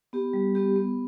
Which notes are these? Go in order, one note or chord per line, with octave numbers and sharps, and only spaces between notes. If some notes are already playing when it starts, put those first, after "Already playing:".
B3 G4
G3
B3 G4
B3